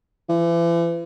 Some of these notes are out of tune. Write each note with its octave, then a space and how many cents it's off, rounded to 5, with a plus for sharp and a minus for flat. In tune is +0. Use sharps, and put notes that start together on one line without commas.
E3 +40